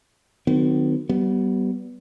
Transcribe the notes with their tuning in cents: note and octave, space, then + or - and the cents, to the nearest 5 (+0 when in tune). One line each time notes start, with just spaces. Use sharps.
D#3 -30 F#3 -10 B3 +45
G3 -35 B3 -5